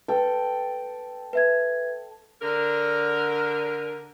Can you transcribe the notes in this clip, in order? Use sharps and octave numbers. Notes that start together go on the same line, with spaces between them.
A4 B4 G5
B4 E5 G#6
D3 A#4